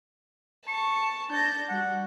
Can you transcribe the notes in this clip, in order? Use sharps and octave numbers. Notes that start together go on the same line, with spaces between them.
A5 C#6
D4 A5 G6 A#6
G3 F#4 F#5